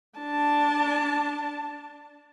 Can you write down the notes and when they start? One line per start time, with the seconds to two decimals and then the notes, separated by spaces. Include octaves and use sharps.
0.19 D4 A5